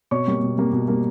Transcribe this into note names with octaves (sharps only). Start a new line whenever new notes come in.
B2 C#5 C#6
G3 A#3
B2
G3 A#3
B2
G3 A#3